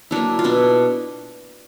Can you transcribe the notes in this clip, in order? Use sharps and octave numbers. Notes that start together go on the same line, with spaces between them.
F#3 A#3 D4 E4
F4
B2 D4 E4